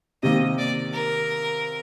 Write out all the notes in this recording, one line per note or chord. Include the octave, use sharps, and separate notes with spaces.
C3 D#3 A#3 D#5
D5
A#4